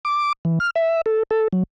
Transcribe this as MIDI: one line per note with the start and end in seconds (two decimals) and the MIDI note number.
0.05 0.33 86
0.45 0.59 52
0.60 0.70 89
0.75 1.01 76
1.06 1.23 69
1.31 1.48 69
1.53 1.63 54